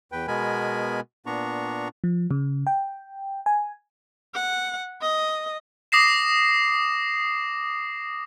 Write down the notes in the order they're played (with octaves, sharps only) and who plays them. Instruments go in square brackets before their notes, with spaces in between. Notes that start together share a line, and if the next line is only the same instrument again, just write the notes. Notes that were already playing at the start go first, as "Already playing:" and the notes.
[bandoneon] E2 B4 G5
B2 G#3 B3 A#4 G#5 B5
A#2 B3 D4 A#5 C#6
[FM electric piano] F3
C#3
G5
G#5
[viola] F#5
D#5
[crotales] D6 D#6 A#6 C7 E7